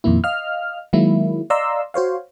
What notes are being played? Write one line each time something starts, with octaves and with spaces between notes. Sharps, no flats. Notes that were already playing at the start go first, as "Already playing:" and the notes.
F2 A#2 D#3 A#3 E4
D#5 F5 F6
D#3 F#3 G#3 A#3 E4
D5 D#5 F5 A#5 C6 E6
F#4 C5 C#5 F5